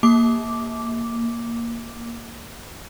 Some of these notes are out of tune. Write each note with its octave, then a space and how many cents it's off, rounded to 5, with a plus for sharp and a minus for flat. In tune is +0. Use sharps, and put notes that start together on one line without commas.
A#3 +0 D6 -5